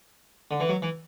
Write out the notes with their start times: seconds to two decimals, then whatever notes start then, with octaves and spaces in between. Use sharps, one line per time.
0.51 D3
0.60 E3
0.69 F#3
0.82 E3